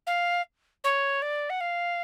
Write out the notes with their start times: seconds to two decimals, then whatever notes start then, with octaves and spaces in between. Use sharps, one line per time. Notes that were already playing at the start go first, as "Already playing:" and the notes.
0.07 F5
0.84 C#5
1.22 D5
1.50 F#5
1.60 F5